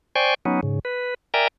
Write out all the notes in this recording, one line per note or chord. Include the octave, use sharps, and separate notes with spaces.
C5 D5 G5 G#5 C#6
F#3 B3 C#4 D#4
G#2 C#3
B4
A#4 D5 E5 G5 G#5 A#5